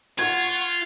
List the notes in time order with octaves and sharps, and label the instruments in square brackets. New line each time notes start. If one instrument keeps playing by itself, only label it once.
[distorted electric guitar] F4 [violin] F#5 C#6 [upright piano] G#6